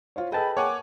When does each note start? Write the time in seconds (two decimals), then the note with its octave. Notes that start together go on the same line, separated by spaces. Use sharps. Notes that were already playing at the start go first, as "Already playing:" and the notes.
0.16 F4 C5 C#5
0.32 G#4 A4 B4 D#5 G5 A5 B5
0.57 A#3 C#5 F#5 G#5 D6